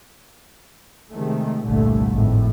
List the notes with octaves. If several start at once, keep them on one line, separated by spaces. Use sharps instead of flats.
C3 D#3 G#3 A3
G1 C2 A#2 D3 A3
G#1 F2 A2